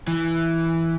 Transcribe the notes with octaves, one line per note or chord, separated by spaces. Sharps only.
E3